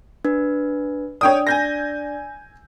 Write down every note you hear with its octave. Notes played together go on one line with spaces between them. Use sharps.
D4 B4
D4 C#5 D5 G5 D#6
G#5 G6 A#6